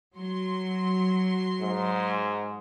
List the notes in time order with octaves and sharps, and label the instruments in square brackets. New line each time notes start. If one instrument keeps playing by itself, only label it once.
[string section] F#3 C6
[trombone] G#2